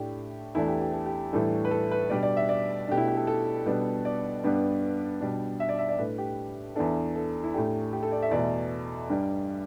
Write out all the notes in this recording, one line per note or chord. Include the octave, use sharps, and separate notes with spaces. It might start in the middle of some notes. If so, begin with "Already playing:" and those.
Already playing: A2 A3 D4 G4
E2 E3 A3 D4 E4
G4
G4
A4
G4
A2 E3 G3 D4 A4
B4
A4
B4
B2 G3 D4 D5
D5
E5
D5
B2 A3 D4 G4
E4
G4
A4
A4
B2 G3 B3 D4
D5
G2 G3 B3 D4
B2 G3 D4
E5
D5
E5
D5
A2 A3 D4 B4
G4
E2 E3 B3 D4 A4
A4
E4
A2 A3 D4 G4
G4
A4
D5
E5
E2 B2 A3 D5
G2 G3 D4